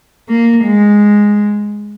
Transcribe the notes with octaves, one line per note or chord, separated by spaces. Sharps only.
A#3
G#3